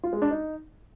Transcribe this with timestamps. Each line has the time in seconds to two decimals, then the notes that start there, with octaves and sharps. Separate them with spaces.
0.03 F4
0.13 G#3
0.22 D4
0.31 D#4